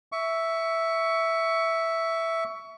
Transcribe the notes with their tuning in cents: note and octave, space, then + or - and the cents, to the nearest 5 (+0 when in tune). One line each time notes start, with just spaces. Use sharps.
E5 +0 C#6 +20